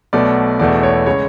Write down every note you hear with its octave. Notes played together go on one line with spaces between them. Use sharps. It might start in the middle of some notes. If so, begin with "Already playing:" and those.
B1 B2 A3 D5
E1 E2 B2 A3 D5
C#5
C#3 G#3 C#5